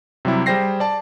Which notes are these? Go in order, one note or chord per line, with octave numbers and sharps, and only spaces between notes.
C3 F#3 G3 E4
G3 G#4 C5 G5 A#6 C7
D5 A5